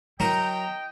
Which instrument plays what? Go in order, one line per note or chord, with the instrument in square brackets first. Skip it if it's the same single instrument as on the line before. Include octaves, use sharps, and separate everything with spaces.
[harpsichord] F#3 A#4 [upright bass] E4 [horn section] D#5 G5 [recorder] A#5